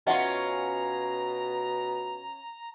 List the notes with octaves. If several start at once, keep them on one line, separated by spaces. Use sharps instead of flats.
B2 C#4 F4 D#5 E5 F#5 A#5